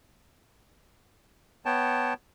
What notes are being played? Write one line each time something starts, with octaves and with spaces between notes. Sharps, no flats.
B3 C#5 G5 A5